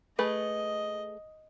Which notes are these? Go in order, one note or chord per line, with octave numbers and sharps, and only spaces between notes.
A3 G#4 B4 D#5